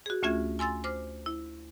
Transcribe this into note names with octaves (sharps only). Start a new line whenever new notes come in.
F#4 G#4
D2 A3 C#4 F4 E5 G#6
G#5 C6 E6 A6
C5 D6 F6
E4